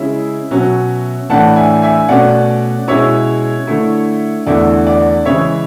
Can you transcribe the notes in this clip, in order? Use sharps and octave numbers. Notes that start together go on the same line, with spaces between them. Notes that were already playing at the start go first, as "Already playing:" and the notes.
Already playing: C#3 G#3 C#4 E4 E5
B2 F#3 C#4
A2 E3 A3 D4 F#5 A5
E5 G#5
E5 G#5
B2 A3 C#4 D5 F#5
B2 G#3 C#4 E4 C#5 E5
D3 A3 E4
E2 D3 A3 E4 D5
D5
C#3 E3 G#3 C#5 E5